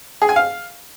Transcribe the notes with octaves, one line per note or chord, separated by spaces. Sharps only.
G#4
G#5
F5